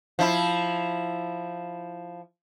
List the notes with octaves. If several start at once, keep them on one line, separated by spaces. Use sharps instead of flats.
F3 E4